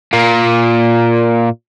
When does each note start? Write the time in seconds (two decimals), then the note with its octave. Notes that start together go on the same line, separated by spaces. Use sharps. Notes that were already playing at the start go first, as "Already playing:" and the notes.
0.13 A#2 A#3